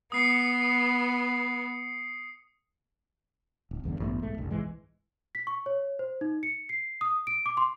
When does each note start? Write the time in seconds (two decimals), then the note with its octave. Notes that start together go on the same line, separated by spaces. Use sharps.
0.12 B3 D#6 C7 C#7
3.71 D1
3.84 F#1 E2 G2 D3
4.00 A1 G2 A3 B3
4.22 B1 G#2 A3
4.37 F#1 C2 G2
4.51 B1 G#2 E3 G#3
5.35 B6
5.47 C#6
5.66 C#5
5.99 C5
6.21 D#4
6.43 C#7
6.69 C7
7.01 D#6
7.27 D7
7.46 D6
7.57 C6